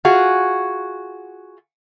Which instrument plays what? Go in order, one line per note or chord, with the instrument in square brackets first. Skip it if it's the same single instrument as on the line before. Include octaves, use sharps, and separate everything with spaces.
[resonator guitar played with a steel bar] F4 F#4 G#4